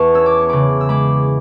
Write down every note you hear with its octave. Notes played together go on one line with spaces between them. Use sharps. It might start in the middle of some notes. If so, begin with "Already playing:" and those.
Already playing: E2 B3 A5 C#6
C#4 E6
D6
C#6
C#3 B5 D6
E6
G#3 B5 D6